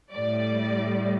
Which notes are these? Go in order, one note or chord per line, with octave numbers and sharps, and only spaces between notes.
A2 G3 D5